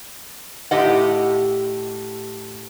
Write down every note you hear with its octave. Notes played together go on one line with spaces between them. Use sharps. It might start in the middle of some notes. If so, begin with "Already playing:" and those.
A2 G4 D#5 F#5